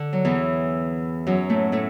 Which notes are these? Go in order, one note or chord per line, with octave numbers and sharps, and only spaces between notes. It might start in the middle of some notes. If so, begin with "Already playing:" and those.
Already playing: D3
F#3
E2 E3
F#2 F#3
A2 A3
A2 A3